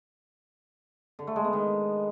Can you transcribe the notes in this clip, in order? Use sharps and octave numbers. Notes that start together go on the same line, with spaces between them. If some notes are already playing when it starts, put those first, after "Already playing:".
D3
A3
G#3
B3
D#3